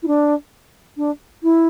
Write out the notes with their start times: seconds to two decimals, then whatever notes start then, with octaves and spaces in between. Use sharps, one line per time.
0.02 E4
0.07 D4
0.97 D4
1.43 E4